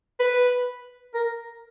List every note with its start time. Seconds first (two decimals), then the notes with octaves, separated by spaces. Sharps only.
0.20 B4
1.14 A#4